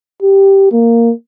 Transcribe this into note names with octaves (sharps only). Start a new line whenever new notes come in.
G4
A#3